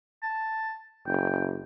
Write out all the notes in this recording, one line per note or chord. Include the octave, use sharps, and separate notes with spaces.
A5
F#1 G5